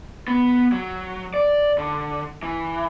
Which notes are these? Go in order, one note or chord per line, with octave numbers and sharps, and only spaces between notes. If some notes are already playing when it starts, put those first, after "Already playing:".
B3
F#3
D5
D3
E3